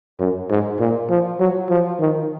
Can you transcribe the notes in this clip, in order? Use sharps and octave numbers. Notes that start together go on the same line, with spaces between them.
F#2
G#2
A#2
F3
F#3
F3
D#3